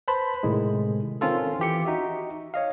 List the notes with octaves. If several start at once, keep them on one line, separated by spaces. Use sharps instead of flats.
B4 C5 A5 B5 C6
A2 C3 D#3 G#3
D#3 C4 C#4 F4 A4
E3 G4 C#7
D#4 F#4 E5
C#5 D#5 F5